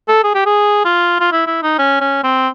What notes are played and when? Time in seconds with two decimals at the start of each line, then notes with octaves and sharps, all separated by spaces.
0.08 A4
0.24 G#4
0.34 G4
0.46 G#4
0.85 F4
1.20 F4
1.32 E4
1.46 E4
1.62 D#4
1.78 C#4
2.01 C#4
2.24 C4